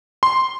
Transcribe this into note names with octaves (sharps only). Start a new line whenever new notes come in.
C6